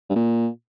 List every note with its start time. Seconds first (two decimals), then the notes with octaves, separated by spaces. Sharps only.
0.09 G2
0.16 A#2